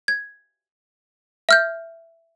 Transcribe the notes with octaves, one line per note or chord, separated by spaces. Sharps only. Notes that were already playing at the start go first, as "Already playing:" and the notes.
G#6
E5 F6 G6